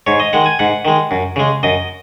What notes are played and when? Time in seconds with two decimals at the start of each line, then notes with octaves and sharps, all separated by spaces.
0.07 G#2 C#5
0.20 D#5
0.33 D#3 G#3 F#5
0.46 G#5
0.59 G#2 F#5
0.85 D#3 G#3
1.11 F#2
1.36 C#3 G#3
1.63 F#2 D#5